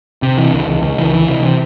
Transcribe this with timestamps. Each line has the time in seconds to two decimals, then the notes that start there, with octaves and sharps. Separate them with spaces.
0.22 C3
0.38 E3
0.53 C#2
0.68 C#2
0.83 C#2
0.98 E3
1.13 E3
1.28 C3